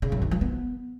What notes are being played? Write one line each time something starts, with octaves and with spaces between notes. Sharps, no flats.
C#3
F#2
D#3
F3
B3